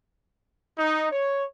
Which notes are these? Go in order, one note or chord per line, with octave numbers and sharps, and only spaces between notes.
D#4
C#5